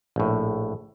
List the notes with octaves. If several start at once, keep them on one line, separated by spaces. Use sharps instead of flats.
A#1 A2